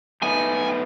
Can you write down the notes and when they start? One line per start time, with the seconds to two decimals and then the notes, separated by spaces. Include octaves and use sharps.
0.22 A3 B3 D#4 G#5